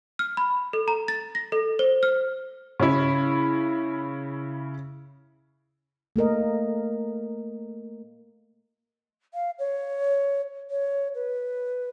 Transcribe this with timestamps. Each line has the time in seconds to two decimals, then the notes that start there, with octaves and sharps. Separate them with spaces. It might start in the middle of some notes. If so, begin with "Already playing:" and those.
0.19 F6
0.37 B5
0.73 A4
0.88 A#5
1.08 A6
1.35 A#6
1.52 A4
1.79 C5
2.03 F6
2.80 C#3 C#4 E4
6.16 A3 A#3 A#4 D#5
9.34 F5
9.59 C#5
10.70 C#5
11.15 B4